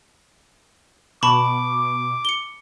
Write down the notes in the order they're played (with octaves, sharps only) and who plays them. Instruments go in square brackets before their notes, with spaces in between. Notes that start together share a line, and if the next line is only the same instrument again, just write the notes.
[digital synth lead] B2 [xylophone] A5 B5 C#6 [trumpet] D6
[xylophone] C#7 G7